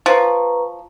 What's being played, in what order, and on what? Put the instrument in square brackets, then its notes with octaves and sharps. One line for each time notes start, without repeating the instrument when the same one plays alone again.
[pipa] F3 [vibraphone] B4 A#5 C#6